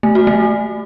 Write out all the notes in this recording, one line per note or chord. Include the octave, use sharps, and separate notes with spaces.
A3
F#4
A3